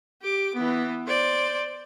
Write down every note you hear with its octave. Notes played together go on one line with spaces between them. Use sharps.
G4 D6
E3 B3
C5 D5